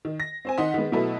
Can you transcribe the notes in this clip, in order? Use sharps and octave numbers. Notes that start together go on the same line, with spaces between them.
D#3
A#6
C4 C5 G#5
D#3 D#4 F#5 C6 D#6 B6
D#3 G#3 B3
B2 F#3 A3 E4 A4 B4